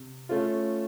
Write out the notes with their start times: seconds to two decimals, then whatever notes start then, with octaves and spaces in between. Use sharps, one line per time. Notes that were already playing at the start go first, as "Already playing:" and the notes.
Already playing: C3
0.29 A3 C#4 F4